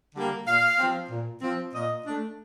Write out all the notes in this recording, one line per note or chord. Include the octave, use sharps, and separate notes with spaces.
D3 G3 A#3
A#2 F5
F3 C4
A#2
F3 C4
A#2 D#5
A3 D4